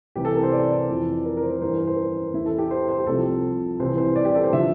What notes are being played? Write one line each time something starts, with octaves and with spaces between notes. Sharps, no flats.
C2 C3 E3 G4
A4
A#4
C5
D5
F2 E3
A#4
A#4
C5
G2 E3 C5
A#4
C5
A#4
E2 E3 E4
A4
G4
C5
C5
G4
C2 C3 F3 A4
C2 C3 E3 C5
C5
D5
G4
A4
C5
D3 F3 E5